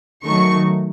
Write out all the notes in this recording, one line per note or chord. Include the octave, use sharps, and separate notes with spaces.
D#3 F#3 A3 C#6